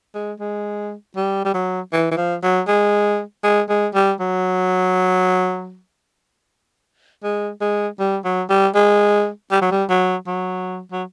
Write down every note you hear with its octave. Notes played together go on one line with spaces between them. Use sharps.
G#3
G#3
G3
G3
F#3
E3
E3
F3
F#3
G#3
G#3
G#3
G3
F#3
G#3
G#3
G3
F#3
G3
G#3
G3
F#3
G3
F#3
F#3
F#3